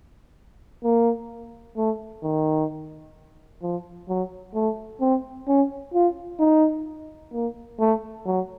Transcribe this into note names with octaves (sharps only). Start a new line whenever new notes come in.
A#3
A3
D#3
F3
F#3
A3
C4
C#4
F4
D#4
A#3
A3
F#3